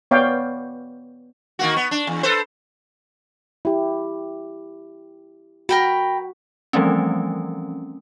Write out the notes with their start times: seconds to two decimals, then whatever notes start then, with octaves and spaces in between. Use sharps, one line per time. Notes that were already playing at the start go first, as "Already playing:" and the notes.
0.11 B3 C#5 D5 F5 G5
1.59 D#3 A#3 F#4
1.76 B3
1.91 D4
2.07 E2
2.23 A4 B4 C5
3.65 E4 G4
5.69 F#4 A#4 G5 B5
6.73 E3 F3 G3 A3 C4 C#4